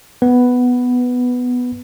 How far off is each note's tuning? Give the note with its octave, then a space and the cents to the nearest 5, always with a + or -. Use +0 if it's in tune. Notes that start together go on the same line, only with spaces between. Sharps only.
B3 +5 B4 +0